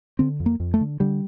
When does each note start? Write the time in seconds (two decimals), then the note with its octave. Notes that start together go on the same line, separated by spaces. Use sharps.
0.19 D3 C4
0.40 F2
0.46 A#3
0.60 F2
0.74 A3
0.81 D3
1.00 D3 G3